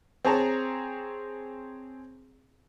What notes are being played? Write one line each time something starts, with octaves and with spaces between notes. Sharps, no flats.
C4 G#4 C#5 A5 A#5